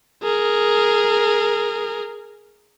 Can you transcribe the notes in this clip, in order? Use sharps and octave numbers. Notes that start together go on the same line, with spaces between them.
G#4 A#4